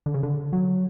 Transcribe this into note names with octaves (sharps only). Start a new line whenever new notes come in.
D3
C#3
D3
F#3